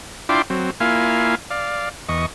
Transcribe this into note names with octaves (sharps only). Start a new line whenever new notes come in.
D4 E4 F4 G5 C6 D6
F#3 C4
A#3 E4 F4 F5 G#5
D5 F5
E2 D#5 C#6